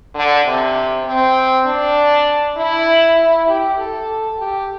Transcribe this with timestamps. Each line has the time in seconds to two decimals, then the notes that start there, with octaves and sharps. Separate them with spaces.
0.15 D3
0.45 C3
1.06 C4
1.65 D4
2.57 E4
3.17 E4
3.48 G4
3.78 A4
4.38 G4